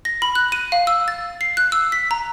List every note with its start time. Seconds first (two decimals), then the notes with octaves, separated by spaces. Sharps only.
0.05 A#6
0.22 B5
0.35 F#6
0.52 D#7
0.72 F5
0.87 E6
1.08 A6
1.41 C7
1.57 F#6
1.72 E6
1.92 B6
2.11 A#5